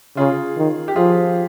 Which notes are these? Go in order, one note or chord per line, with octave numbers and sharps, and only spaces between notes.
C#3 F4 G#4
D#3
G4
F3 F4 G#4